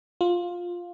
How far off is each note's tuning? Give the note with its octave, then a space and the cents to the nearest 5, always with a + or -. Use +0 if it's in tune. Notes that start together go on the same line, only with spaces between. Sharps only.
F4 +10